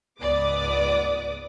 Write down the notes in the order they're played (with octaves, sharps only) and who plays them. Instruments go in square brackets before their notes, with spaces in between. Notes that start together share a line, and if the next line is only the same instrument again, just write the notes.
[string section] C#2 G#2 B3 D5 D6 D#6